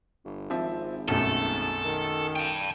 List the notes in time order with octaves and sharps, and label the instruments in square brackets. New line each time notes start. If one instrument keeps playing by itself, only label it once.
[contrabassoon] G1
[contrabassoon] G#1 [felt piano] F3 C4 E5
[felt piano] B1 F#2 A3 [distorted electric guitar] A4
[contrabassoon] D#3
[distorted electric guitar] G5 A5